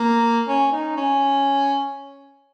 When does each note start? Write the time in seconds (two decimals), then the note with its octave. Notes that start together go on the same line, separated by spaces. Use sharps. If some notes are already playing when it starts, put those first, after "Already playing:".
Already playing: A#3
0.48 C#4
0.72 D#4
0.97 C#4